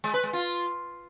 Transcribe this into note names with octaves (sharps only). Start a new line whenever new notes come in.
G#3
B4
G#3
F4